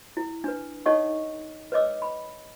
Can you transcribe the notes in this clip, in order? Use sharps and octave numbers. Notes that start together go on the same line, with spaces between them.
E4
D4 B4
D#4 A4 C#5 D#5 F#5 C#6
B4 C#5 D#5 D6 E6
B5